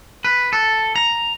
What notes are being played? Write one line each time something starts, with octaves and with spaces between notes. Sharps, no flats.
B4
A4
A#5